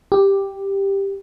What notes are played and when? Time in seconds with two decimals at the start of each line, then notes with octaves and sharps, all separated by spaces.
0.12 G4